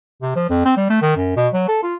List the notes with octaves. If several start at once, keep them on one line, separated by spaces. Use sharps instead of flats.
C3
F3
F2
C4
G3
A3
D#3
F#2
B2
F#3
A4
F4